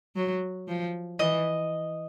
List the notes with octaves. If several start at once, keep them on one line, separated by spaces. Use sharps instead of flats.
F#3
F3
E3 D#5